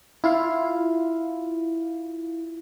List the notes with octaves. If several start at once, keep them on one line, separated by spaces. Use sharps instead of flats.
E4 F4 F5